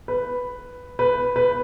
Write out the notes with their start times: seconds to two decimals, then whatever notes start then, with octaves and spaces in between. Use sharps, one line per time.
0.08 B4
0.99 B4
1.36 B4